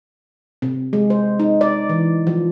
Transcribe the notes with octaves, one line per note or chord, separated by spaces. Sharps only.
C3
G#3
C5
D#4
D5
E3
F3